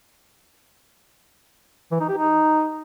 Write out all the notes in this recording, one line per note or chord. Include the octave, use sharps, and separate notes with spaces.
E3
D#4
G4
D#4